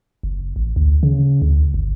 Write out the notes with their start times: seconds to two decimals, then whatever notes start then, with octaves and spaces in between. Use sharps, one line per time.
0.23 F#1
0.56 A1
0.76 D2
1.03 C#3
1.42 D2
1.74 G1